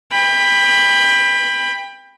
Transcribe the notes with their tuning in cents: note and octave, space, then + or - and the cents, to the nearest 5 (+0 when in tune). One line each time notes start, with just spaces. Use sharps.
G5 +30 B5 +0